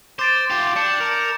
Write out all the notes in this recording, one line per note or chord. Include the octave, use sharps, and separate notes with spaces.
C5 D6 A6 D7
F4 G4
D4 G6 C#7 E7
A#4